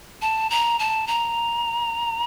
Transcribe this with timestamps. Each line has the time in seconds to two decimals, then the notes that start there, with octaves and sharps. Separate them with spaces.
0.22 A5
0.51 A#5
0.79 A5
1.07 A#5